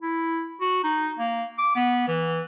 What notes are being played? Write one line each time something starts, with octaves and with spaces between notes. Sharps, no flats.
E4
F#4
D#4
A#3
D6
B3
E3